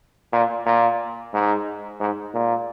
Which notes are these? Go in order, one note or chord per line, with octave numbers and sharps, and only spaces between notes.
A#2
A#2
G#2
G#2
A#2